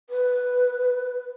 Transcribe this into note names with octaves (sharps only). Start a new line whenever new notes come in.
B4